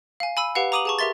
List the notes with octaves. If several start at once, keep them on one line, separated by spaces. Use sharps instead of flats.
F5 G#5
G#5 B5 E6 D#7
G4 B4 F5 F#5
A#5 D6 D#6 D#7 F7 F#7
G#4 A5 C#6
G4 A#4 E5 C6 A6